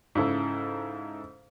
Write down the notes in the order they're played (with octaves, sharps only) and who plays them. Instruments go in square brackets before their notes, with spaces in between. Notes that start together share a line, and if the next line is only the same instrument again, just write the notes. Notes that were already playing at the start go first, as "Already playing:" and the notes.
[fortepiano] G#2 C#3 E4 A4